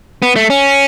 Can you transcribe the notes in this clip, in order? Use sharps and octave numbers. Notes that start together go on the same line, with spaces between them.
B3
A3
C#4